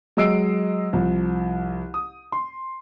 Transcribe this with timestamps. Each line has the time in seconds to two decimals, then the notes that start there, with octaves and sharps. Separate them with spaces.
0.17 F#3 G#3 D#5 E6 C7 D7
0.93 C2 F3
1.94 D#6
2.32 C6